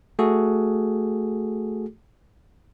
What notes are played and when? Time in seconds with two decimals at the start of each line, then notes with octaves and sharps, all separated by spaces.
0.19 A3 F#4 G#4 A4